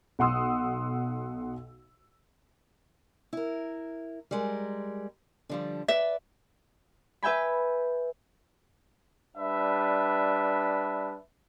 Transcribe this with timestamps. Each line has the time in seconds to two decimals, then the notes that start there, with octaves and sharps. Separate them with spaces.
0.19 B1 F#5 C6 D#6 E6
3.33 E4 A#4
4.31 G3 G#3 A#4
5.49 D3 F3 G3
5.88 B4 D5 E5
7.23 B4 E5 G5 G#5 B5
9.37 G3 D4 B4 E5